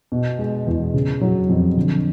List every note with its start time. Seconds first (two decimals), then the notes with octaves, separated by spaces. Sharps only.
0.12 B2
0.39 G#3
0.67 E2
0.94 C#3
1.21 F#3
1.49 F2
1.77 D3